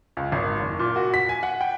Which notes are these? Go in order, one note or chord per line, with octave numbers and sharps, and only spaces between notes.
C#2
G#1
F#1
A#2
F#4
B6
G#5
F#5
G5